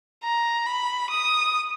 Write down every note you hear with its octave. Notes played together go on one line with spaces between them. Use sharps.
A#5
B5
D#6